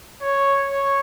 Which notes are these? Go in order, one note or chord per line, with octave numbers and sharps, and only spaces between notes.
C#5
C#5